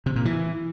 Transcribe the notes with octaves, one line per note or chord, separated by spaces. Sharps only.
C3
A#2
E3